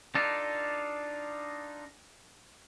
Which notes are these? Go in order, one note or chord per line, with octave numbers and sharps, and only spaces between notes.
D4 D#4 F4 A4